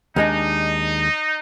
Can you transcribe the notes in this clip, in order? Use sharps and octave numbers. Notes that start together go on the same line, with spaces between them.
D#2 G#3 D4 D#4